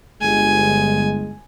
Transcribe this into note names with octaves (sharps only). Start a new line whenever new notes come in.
G1 G#3 G#5